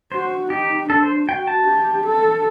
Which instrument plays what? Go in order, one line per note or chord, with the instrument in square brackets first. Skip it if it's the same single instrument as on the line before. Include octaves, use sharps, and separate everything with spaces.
[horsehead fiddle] F#4 [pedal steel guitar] C5
[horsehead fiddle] D#4 [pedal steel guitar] G4
[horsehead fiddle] D4 [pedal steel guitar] A4
[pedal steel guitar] C5
[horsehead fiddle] F#4 [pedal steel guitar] G5
[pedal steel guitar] A5
[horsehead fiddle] G4
A4